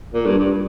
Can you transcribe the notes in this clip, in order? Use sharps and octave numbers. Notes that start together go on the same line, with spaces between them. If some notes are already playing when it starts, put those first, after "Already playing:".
A#2
G2
G2